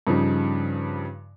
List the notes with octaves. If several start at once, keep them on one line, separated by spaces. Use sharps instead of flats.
G2 C#3 F3 D#4